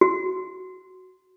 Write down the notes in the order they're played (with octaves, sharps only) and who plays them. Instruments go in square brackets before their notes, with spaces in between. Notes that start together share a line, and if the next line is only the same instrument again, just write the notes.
[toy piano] F#4